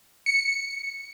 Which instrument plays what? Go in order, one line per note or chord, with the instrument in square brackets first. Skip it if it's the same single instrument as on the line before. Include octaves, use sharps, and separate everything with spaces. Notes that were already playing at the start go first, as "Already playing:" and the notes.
[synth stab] C#7